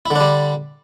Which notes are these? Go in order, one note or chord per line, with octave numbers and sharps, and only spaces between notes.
D3 G3 D4 E4